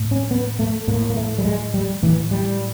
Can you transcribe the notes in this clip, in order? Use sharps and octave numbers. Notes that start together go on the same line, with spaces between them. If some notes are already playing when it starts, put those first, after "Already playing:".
Already playing: A2
C#4
B3
A3
A2 A#3
A#3
A3
G3
G#3
G3
A2 E3
G3